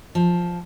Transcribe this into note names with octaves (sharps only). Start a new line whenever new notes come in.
F3